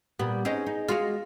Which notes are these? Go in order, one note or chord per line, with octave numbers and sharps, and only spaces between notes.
A#2 G3 B3
C4 C#4 D#4 G#4
D#4
G#3 F4 F#4 F5